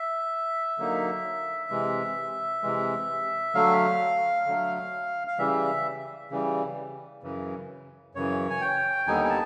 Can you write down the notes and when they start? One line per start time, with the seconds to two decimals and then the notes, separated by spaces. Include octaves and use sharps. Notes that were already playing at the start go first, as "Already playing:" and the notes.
Already playing: E5
0.78 D3 F#3 A#3 D#4
1.70 C3 E3 G#3
2.63 C3 E3 G#3
3.54 D3 F#3 A3 F5
4.47 D3 F#3 A3
5.27 F5
5.39 C#3 E3 G3 E5
6.31 C#3 E3 G3
7.23 F#2 C#3 E3
8.15 F#2 C#3 E3 C#5
8.50 G#5
8.61 G5
9.07 D#2 D3 G3 B3 D#4 G#5
9.25 G#5
9.30 A5